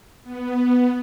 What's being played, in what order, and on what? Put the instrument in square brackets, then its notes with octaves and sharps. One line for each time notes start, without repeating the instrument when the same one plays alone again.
[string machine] B3